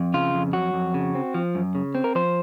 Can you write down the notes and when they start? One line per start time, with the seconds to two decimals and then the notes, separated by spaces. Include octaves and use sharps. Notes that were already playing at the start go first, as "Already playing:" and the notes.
Already playing: F2
0.14 C#3 F4
0.34 F2
0.53 F#3 F#4
0.73 F2
0.94 C#3
1.15 C4
1.34 F3
1.55 F#2
1.75 C#3
1.95 C4
2.04 A#4
2.15 F3 C5